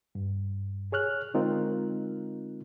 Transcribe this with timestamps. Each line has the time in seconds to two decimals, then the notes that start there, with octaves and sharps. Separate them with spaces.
0.15 G2
0.92 G#4 C#5 F6 F#6
1.34 D3 G#3 C4 D#4 F4 A#4